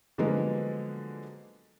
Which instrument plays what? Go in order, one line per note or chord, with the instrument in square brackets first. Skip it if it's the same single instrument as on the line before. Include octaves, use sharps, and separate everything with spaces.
[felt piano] D3 F3 F#3 G#3 A#3 B3